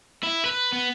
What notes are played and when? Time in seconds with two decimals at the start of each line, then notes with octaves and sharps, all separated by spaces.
0.23 E4
0.46 B4
0.72 B3